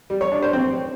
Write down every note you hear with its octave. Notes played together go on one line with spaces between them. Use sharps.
G3
C#5
D4
C5
C4